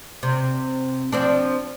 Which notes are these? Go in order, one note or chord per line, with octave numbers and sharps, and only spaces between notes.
C3
F3 C4 D4